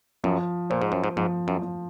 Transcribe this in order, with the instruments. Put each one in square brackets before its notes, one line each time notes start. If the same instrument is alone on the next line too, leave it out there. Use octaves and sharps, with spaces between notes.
[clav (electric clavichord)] F#2 [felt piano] F3
[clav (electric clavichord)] A#2 [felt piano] C5
[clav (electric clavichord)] G#2
F#2
G#2
[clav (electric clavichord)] G#2 [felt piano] F3
[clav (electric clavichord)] F#2
[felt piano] F3